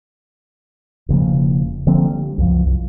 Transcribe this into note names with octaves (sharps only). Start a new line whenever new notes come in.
E1 C#3 F3 A#3
D3 F3 A#3 C4
G3
C#2 F#2 F3
C2